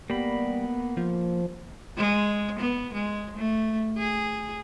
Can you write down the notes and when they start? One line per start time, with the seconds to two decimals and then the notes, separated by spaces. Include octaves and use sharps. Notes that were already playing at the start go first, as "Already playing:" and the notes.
0.10 G3 A#3 B3 B5
0.97 F3
1.97 G#3
2.60 B3
2.94 G#3
3.37 A3
3.98 G#4